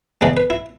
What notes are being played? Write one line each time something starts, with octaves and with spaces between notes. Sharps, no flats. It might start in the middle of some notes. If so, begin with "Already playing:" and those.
E2 C#3 E3 G#3 B4
B4
E4